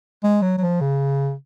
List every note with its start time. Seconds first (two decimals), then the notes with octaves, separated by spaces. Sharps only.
0.24 G#3
0.42 F#3
0.58 F#3
0.61 F3
0.81 C#3